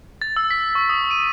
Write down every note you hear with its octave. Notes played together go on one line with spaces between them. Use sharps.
A6
E6
B6
C#6
D#6
D#7